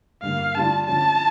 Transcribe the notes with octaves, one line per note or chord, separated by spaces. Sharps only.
G2 D3 G3 A#3 F5
D3 G3 D4 F4 A5
D3 F3 C#4 A5